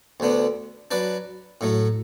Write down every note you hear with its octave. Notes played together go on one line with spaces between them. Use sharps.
D2 D3 B3 D4
F#3 D4 B4 D5
A2 F#3 A3